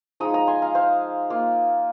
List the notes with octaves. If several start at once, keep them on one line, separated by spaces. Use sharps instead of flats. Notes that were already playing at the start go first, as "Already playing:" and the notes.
F3 G#3 D#4 A#5 D#6
A#5 D#6
G#5 C6
F5 A#5
C5 F5
A#3 F4